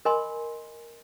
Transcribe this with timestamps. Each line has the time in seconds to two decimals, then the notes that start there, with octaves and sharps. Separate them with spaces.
0.05 A#4 D#5 G#5 B5 C6